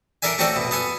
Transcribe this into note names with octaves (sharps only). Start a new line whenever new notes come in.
D4 A4 A#4 D5 E5 G#5
A3 C4 C#4 F#4 A4 D5
B2
B3 A4 G#5